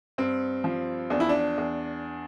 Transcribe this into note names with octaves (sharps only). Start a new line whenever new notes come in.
G2 C4
F3
E2 D4
E4
D4
E2